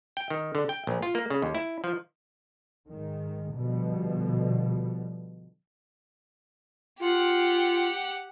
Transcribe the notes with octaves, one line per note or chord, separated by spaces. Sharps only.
G5
D#3
D3
G5
A#1
F4
A#3
C#3
D#2
E4
F3
G#2 D#3
B2 D3 F3 G3
F4 G4 F#5